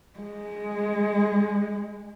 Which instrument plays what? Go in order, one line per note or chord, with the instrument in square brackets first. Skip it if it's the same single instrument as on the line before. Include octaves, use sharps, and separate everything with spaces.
[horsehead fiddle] G#3